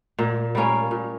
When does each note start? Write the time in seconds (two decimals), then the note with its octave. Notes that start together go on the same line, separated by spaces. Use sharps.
0.19 A#2
0.55 G3 A#3 C#4
0.91 A#2